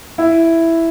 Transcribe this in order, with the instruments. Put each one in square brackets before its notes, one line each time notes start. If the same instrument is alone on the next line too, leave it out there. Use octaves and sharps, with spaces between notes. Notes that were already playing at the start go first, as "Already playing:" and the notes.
[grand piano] E4